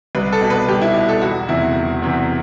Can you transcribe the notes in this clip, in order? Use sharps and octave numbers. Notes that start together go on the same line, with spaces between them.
C2 B4
A4
B2
B4
C2 G4
E4
B2
A4
E1 F#4
E2 C3 E3 E4
E1
E2 C3 E3